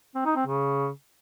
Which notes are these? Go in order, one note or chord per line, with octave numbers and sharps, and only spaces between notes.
C4
D#4
C4
C#3